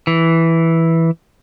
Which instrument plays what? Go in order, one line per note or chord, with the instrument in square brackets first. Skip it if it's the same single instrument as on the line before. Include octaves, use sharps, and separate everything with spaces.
[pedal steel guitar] E3